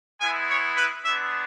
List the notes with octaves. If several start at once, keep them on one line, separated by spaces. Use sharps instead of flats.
G#3 B3 E4 G#5
C#5
B4
G#3 B3 D4 E5